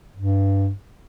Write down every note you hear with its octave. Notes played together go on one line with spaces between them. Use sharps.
G2